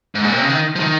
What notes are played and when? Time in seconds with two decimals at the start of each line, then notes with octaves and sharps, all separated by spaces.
0.15 G#2
0.24 A#2
0.33 C3
0.41 C#3
0.50 D#3
0.75 F3
0.80 D#3